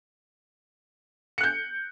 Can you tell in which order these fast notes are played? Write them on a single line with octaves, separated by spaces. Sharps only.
C#7 F#6 G6